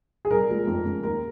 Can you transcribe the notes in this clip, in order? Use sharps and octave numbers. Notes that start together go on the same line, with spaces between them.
G#4
C2 A#4
A#2 F3 G#3
F2
C#3 G#3
D#2 A#4